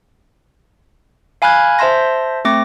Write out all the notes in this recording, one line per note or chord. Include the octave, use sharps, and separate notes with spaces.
F5 G#5 B5 F6 F#6 G#6
C5 E5 A5 C6 A#6
A3 C4 D6 A#6